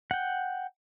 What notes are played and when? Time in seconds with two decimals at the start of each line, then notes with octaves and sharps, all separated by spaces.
0.11 F#5 G5